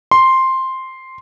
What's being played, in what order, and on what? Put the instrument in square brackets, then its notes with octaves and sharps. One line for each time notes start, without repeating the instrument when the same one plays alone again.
[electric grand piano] C6